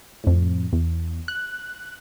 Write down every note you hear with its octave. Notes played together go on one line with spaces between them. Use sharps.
F2 A2
E2
F#6